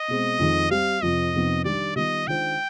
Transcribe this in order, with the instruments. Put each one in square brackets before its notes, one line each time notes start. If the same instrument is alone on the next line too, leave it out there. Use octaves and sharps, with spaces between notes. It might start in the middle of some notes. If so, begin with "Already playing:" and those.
Already playing: [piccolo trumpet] D#5
[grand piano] B2 G#3 C4
F2 D#3 G#3
[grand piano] G3 C4 G4 [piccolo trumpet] F5
[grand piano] F2 C3 F3 C4 [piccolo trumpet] D#5
[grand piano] F2 C3 F3 B3 D#4
[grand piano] D#3 G3 D4 G4 [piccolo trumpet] D5
[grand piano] D#3 G3 B3 F4 [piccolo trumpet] D#5
[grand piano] D#3 G#3 D4 F4 C5 [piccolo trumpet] G5